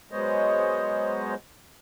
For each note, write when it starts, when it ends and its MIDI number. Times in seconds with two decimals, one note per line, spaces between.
0.11 1.34 54
0.11 1.34 56
0.11 1.34 59
0.11 1.34 72
0.11 1.34 73
0.11 1.34 75